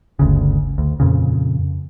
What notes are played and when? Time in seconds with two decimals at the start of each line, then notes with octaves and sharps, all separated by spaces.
0.19 G1 D2 C#3
0.78 D2
1.00 F2 A#2 C#3